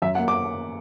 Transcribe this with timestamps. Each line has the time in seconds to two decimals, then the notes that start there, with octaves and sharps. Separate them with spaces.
0.02 F#2 E5
0.15 F#5
0.19 A#3
0.28 D6